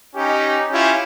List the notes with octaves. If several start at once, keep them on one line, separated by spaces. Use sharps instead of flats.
C#4 D#4 G4
C#4 E4 F4 G4